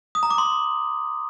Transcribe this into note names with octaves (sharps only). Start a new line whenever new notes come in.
D#6
A#5
D6
C6